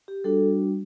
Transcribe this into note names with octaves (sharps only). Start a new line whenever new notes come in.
G4
G3 D4 F#4 A4